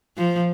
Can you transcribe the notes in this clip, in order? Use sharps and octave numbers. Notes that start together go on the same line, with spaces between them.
F3